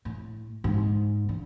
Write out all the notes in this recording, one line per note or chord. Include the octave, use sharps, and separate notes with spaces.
A2
G#2
D3